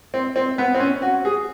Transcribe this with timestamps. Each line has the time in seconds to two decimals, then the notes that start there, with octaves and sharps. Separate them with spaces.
0.14 C4
0.36 C4
0.58 B3
0.74 C4
0.80 C#4
1.02 F#4
1.25 G#4